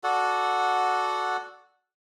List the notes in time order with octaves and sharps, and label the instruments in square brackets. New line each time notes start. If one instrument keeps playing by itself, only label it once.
[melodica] F#4 A4 D5 F#5